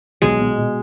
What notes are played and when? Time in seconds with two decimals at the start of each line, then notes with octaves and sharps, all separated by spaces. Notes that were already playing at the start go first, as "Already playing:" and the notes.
0.22 B1 G#3
0.40 B2
0.58 B2